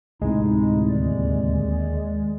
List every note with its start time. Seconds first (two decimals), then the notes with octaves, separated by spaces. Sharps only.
0.22 D2 A2 C3 G#3 D#4 E4
0.89 D#2 D#3 D5